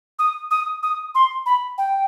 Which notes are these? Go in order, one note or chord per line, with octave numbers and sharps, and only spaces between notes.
D#6
D#6
D#6
C6
B5
G5